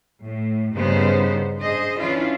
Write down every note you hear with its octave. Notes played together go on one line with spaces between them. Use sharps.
A2
G2 C#3 B3 D#4 C5
D4 G#4 C5 D#5
E3 C#4 D4 E4 F4